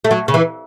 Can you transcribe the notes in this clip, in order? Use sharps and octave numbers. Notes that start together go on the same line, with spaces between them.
A3
F#3
C#3
E3